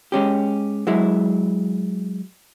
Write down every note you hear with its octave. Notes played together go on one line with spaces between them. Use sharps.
G#3 C#4 G4
F#3 G#3 E4